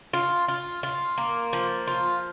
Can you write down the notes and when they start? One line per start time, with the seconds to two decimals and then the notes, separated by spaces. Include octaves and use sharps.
0.13 F4
0.48 F4
0.83 F4
1.18 A#3
1.53 F3
1.88 F4